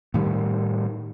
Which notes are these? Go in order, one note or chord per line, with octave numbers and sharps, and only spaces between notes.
A2 D#3 G3